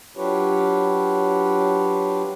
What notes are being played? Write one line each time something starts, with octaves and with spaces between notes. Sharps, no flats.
F#3 D4 F4 G4 B4 C#5